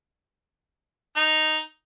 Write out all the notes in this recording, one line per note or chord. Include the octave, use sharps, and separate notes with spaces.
D#4